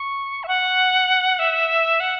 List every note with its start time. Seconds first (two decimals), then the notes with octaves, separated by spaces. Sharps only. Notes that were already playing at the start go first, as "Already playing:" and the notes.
Already playing: C#6
0.44 E5
0.48 F#5
1.39 E5
2.00 F#5